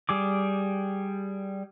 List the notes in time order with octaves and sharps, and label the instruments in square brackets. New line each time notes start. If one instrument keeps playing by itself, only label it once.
[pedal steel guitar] G3 G#4 D6